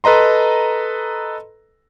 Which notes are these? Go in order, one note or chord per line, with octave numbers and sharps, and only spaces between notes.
A4 B4 D#5 A#5 C6